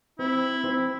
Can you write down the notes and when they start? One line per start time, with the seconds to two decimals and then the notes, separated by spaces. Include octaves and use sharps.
0.19 C4 E4
0.64 C4